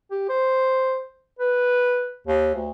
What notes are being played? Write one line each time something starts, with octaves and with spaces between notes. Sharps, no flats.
G4
C5
B4
D#2
D2